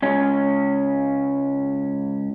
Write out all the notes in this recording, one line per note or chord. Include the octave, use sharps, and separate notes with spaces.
C#2 C#4